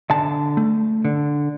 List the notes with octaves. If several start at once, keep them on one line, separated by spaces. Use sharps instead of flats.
D3 A5
A3
D3